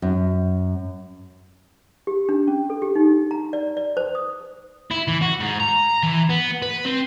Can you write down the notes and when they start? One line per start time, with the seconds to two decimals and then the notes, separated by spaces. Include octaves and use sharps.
0.02 F#2
2.07 G4
2.29 D4
2.47 C#4
2.70 A4
2.82 G4
2.95 D#4
3.31 A#5
3.53 D5
3.77 D5
3.97 C5
4.15 D#6
4.91 E4
5.08 E3
5.22 F#4
5.40 G#2
5.60 A#5
6.03 E3
6.29 B3
6.62 B4
6.85 C4